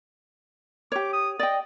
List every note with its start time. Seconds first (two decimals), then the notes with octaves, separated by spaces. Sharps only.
0.92 G4 C#5 D6
1.13 D#6
1.39 D5 D#5 G5